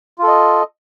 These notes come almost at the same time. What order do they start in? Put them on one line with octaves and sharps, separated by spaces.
F4 A4 D#5